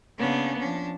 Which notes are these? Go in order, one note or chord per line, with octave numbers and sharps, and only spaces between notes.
C#3 A#3 B3 C#4 D4
F3 C#4 D4